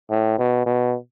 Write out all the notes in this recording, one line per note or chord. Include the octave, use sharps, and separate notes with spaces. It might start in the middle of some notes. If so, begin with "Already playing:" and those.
A2
B2
B2